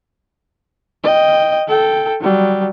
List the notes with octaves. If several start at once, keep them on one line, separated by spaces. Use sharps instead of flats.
D#5 G5
A4 G5
F#3 G3